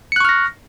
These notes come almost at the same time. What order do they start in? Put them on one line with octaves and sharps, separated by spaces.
C#7 F#6 C#6 F6 A#6